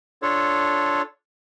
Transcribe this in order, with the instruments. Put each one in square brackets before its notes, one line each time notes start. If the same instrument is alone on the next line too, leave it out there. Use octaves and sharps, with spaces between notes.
[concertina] D4 F4 A4 C#5